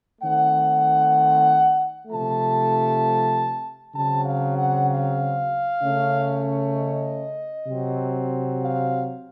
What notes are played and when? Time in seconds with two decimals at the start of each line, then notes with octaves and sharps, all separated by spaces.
0.21 D#3 A3 C4 F#5
2.08 C3 F3 A3 A5
3.94 C#3 F#3 C4 A5
4.25 F5
4.57 F#5
4.88 F5
5.80 C#3 A3 C#4
6.73 D#5
7.66 C3 F#3 C4
8.59 F5